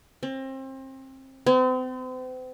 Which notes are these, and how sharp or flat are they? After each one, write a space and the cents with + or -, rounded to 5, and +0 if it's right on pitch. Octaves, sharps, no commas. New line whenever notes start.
C4 +30
C4 -40